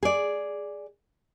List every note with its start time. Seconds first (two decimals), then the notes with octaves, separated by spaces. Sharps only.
0.03 G#4 D5